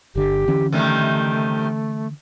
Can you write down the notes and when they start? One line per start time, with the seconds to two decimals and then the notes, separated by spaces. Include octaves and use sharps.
0.15 G1 D3 G4
0.48 D3 E3 C#4
0.72 C3 D#3 G3 A3